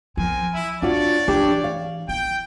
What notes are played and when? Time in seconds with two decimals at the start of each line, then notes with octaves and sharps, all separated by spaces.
0.17 F3 C4 A#4 G#5
0.54 E4
0.82 A#3 D4 F4 F#4 C#5 D5
1.28 E3 D4 G4
1.64 F5
2.09 E4 G5